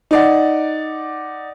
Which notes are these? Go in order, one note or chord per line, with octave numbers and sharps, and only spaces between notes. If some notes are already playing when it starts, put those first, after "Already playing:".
D#4 D5 F#5